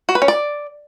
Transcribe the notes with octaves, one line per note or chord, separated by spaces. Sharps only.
F#4
B4
C#4
D5